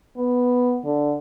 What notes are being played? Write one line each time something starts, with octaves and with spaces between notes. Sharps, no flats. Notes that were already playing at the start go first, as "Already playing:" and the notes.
B3
D3